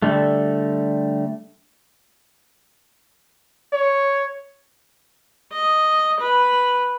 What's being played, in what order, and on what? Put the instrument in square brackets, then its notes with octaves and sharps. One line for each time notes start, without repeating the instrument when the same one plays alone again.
[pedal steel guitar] D3 G3 A3
[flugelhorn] C#5
[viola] D#5
B4